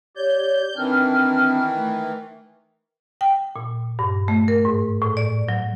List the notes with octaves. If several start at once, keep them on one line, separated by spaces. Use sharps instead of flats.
G4 C#5 D5 G6
D#3 E3 C4 D4 F6
A3
G5
A#2
G2
A3
A#4
G#2
A2
D5
F#3